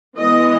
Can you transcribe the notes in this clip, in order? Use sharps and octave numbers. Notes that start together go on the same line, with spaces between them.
E3 G#3 B3 D#5